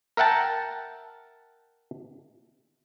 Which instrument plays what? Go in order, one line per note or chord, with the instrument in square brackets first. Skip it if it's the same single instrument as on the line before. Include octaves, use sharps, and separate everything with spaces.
[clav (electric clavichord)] A#4 E5 F#5 G5 A5